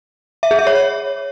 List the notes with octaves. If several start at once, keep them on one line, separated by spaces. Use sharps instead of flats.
E5
G#4
E5
C#5